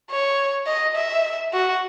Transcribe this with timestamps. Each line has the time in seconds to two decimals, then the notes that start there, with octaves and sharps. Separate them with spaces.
0.10 C#5
0.67 D#5
0.96 E5
1.53 F#4